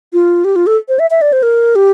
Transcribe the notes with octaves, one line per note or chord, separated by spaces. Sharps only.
F4
G4
F4
A4
C5
E5
E5
D5
C5
A#4
G4